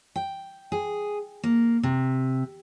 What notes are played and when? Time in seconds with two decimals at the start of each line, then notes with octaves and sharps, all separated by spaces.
0.16 G5
0.72 G#4
1.44 A#3
1.83 C3